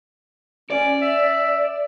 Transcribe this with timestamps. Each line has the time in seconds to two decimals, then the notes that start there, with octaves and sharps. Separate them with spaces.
0.70 C#4 D5
1.02 E5